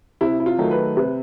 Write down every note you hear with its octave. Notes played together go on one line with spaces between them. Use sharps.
C3 E4
E4
F4
D#3 F#3 A3
B4
C3 B4